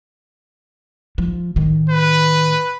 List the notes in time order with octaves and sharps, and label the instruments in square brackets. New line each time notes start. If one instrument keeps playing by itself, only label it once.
[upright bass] F3
A2 D#3
[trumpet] B4